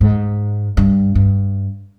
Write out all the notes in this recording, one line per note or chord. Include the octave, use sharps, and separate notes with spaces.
G#2
G2
G2